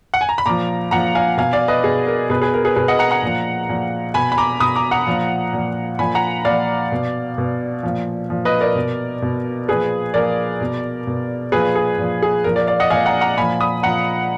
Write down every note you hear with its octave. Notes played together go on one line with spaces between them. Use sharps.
F#5
G#5
A#5
B5
A#2 F3 A#5 D6
A#2 F3 F#5 A#5
F5 G#5
B2 F5 G#5
D5 F5
B4 D#5
B2 G#4
A#4
B2 G#4 B4
G#4 B4
A#4
G#4 B4
B2 G#4 B4
D#5 F#5
F#5 A#5
F#5 A#5
A#2 F3
A#2 F3
B2 G#5 B5
B5
A#5 D6
B2 B5 D#6
A#5 D6
F#5 A#5
A#2 F3
A#2 F3
A#2 F3 G#5 B5
F#5 A#5
A#2 F3 D5 F5
B2
B2
A#2 F3
A#2 F3
B4 D#5
A#4 D5
B2
B2
A#2 F3 G#4 B4
A#2 F3 A#4 D5
B2
B2
A#2 F3 G#4 B4
G#4
A#2 F3
G#4
A#2 F3 A#4
A#4 D5
D5 F5
D#5 F#5
A#2 F3 F5 G#5
F#5 A#5
F#5 A#5
A#2 F3 G#5 B5
B5 D#6
A#2 F3 F#5 A#5